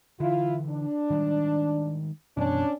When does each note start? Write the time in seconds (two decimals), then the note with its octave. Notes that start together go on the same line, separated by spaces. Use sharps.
0.20 D3 E3 E4 F4
0.70 D4
1.10 D#3 G3 G#3
2.37 F#2 B2 E3 C#4 D4